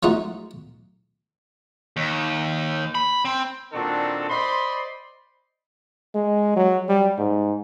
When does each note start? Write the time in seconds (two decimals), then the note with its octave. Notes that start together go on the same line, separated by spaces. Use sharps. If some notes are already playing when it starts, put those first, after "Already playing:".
0.03 F3 G#3 A3 D#4 F4 F#4
1.97 D#2
2.95 B5
3.25 C4
3.73 A#2 D#3 C4 D4 F#4 A4
4.29 C5 D5 D#5 B5 C6
6.14 G#3
6.56 F#3
6.88 G3
7.18 G#2